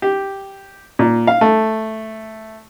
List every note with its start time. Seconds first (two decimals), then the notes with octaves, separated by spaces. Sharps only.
0.02 G4
0.99 A#2
1.27 F5
1.41 A3